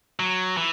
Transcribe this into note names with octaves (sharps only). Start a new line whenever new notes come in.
F#3
E3